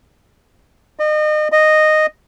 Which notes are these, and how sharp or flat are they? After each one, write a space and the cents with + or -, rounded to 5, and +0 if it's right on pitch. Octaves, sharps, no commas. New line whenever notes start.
D#5 -35
D#5 -10